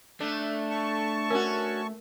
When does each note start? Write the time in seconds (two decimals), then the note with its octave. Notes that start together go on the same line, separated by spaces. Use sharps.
0.20 A3 D4
0.70 A5 C#6
1.30 C#4 F#4 A#4